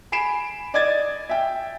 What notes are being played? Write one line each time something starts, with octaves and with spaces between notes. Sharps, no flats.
G#5 B5 C7 D7 E7
D5 D#5 G#6 A6
E5 G5